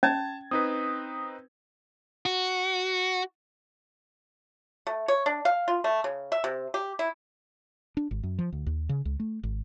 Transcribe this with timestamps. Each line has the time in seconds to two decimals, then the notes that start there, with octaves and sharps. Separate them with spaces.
0.03 C#4 A5 G#6 A6
0.51 C4 D#4 B4 D#6
2.26 F#4
4.87 A3
5.08 C#5
5.26 D4
5.45 F5
5.68 F4
5.84 A3
6.04 C#3
6.32 E5
6.44 C3
6.74 G4
6.99 E4
7.97 D4
8.11 G#1
8.23 F#2
8.39 F3
8.52 D2
8.66 D#2
8.89 C#3
9.05 C#2
9.20 A3
9.43 G#1